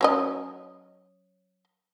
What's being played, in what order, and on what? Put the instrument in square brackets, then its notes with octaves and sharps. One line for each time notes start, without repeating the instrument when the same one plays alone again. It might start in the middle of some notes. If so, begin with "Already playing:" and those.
[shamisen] F#3 C#4 D#5